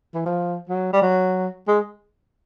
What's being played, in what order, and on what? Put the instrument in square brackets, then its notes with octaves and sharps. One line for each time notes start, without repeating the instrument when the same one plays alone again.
[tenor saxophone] E3
F3
F#3
G3
F#3
G#3